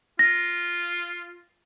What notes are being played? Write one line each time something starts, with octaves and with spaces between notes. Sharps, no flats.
F4 A#6